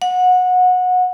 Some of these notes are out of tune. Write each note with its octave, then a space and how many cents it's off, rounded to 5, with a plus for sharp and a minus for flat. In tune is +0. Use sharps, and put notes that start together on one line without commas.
F#5 -20